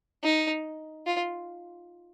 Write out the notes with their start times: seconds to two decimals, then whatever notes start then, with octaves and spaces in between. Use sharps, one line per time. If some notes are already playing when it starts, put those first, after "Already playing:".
0.23 D#4
1.06 F4